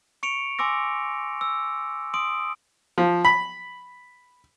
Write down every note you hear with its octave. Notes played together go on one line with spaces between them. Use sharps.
C#6 C#7 D7 F7
G#5 C6 D6 E6 A#6
E6
C6 D#6 D7
F3
B5